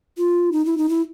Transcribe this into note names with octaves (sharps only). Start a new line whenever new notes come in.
F4
D#4
E4
D#4
E4